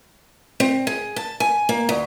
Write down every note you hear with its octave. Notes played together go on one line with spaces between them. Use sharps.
C4
G#4
A5
G#5
A#3
D2